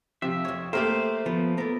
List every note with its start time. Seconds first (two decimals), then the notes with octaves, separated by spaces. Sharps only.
0.22 C3 F3 E5
0.45 F2 C#5
0.73 A3 A#3 G4 A#4 C5 E5
1.26 F3 B3
1.58 B3 A4 A#4